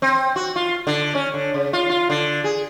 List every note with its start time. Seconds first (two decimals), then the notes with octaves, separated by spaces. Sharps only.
0.02 C4
0.36 F#4
0.56 F4
0.87 D3
1.15 C#4
1.34 D3
1.54 C#3
1.73 F4
1.89 F4
2.10 D3
2.44 G#4